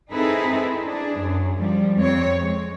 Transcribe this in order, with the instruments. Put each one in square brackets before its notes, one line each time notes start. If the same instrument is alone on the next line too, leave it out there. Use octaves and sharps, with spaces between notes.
[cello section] C4 D#4 E4 G#4 A4 B4
D4 G#4
F#2
F3 G3
F2 C4 C#5
G#3